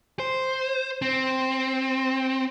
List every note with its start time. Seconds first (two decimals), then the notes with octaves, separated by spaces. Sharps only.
0.19 C5
1.02 C4